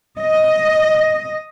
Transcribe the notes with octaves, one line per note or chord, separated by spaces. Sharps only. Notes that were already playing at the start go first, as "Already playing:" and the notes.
D#5